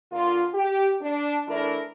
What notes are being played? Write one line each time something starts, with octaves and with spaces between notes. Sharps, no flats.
D3 A#3 F4
G4
D4
E3 A3 D4 E4 A#4